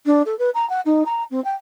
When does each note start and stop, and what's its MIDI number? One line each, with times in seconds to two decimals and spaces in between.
0.06 0.22 62
0.26 0.37 69
0.39 0.50 71
0.55 0.68 82
0.70 0.81 78
0.85 1.03 63
1.06 1.24 82
1.31 1.43 60
1.44 1.54 79